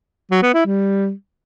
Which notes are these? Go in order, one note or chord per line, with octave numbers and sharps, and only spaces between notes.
F#3
B3
E4
G3